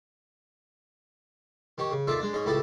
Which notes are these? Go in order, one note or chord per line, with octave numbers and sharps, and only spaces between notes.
D#3 G4 C#5
C#3
D#2 F4 A4 D5 E5
G#3 D4
G#2 C#4 D#5
C#2 A2 E4 G4 A4 D#6